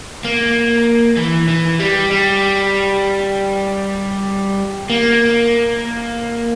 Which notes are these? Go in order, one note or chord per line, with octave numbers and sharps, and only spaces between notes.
A#3
E3
E3
G3
G3
A#3